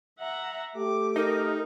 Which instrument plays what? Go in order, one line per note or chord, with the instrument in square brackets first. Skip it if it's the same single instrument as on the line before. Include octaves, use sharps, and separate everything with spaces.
[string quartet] E5 F#5 A#5
[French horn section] A3 G4 [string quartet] D6
[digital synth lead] D#4 [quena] A#4